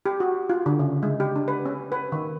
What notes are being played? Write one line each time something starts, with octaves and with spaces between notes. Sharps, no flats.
G4
F#4
F4
D3
C#3
G#3
G4
D4
B4
C#4
B4
D#3